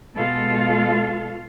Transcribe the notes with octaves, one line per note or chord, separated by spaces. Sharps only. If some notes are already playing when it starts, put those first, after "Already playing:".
B2 G#3 F4 A4 F5